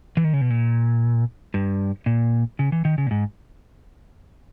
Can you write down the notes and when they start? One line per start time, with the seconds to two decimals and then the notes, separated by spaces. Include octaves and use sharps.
0.17 E3
0.24 D#3
0.33 C#3
0.41 B2
0.50 A#2
1.54 G2
2.06 A#2
2.59 C#3
2.72 E3
2.85 D#3
2.98 C#3
3.07 A#2
3.11 G#2